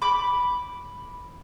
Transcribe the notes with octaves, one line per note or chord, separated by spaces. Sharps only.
B5 D6